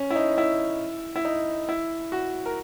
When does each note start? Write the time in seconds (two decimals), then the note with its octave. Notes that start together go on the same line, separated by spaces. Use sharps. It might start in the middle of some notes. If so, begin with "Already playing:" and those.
Already playing: C#4
0.10 E4
0.16 D#4
0.38 E4
1.16 E4
1.25 D#4
1.69 E4
2.12 F#4
2.46 A#4